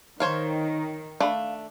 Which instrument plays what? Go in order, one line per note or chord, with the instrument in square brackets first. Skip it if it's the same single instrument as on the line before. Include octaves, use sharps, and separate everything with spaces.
[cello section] D#3 [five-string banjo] C5 C#5 F5
[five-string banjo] A3 D4 [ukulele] F5 B5